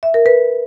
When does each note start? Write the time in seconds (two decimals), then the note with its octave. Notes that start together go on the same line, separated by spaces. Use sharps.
0.03 E5
0.14 A#4
0.26 B4